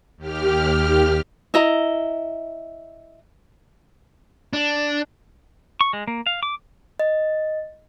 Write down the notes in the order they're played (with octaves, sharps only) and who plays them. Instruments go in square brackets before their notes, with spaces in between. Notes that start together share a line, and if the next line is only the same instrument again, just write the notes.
[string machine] D#2 G4 F6
[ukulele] E4 D#5 A#5
[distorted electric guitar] D4
[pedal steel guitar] C#6
G#3
A#3
F5
D6
[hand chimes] D#5